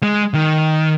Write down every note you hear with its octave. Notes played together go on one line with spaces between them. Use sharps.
G#3
D#3